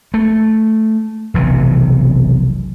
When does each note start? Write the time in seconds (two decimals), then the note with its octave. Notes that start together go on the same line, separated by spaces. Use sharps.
0.14 A3
1.34 F1 B1 C3 E3